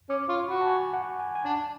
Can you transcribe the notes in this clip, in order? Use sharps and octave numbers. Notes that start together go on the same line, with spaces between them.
C#4 D6
F4 C#6
F#4 B5
A5
G#5
F#5
G#5
G#5
D4 A5